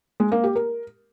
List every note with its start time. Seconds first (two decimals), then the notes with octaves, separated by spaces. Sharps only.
0.20 G#3
0.32 A#3
0.44 G4
0.55 A#4